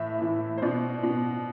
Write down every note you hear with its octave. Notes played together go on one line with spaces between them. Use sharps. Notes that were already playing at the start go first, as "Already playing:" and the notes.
Already playing: A2 E3 E5
A2 E3
C5
B2 D5
B2